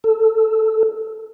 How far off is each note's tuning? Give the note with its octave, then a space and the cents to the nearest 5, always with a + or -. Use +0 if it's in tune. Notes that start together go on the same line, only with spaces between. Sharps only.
A4 +0